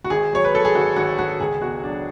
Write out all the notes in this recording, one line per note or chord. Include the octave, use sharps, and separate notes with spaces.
F#4
G#1 G#4
F#3 C#5
B4
F#3 A4
G#4
G#1 F#4
G#1 F#4
G#1 F#4
C#2 G#4
B2 F#4
F#3 D4